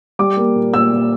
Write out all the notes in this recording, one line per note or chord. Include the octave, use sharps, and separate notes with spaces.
G3 D6
A#3
A#2
A#2 E6
A#2